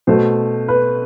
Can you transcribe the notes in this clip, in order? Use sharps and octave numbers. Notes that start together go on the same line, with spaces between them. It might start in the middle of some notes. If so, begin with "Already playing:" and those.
B2 A3 C5
B4